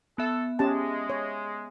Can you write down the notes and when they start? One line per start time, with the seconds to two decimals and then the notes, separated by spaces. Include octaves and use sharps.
0.18 A3 B3 A4 E5
0.59 G#3 C#4 G4 A5
1.10 C#5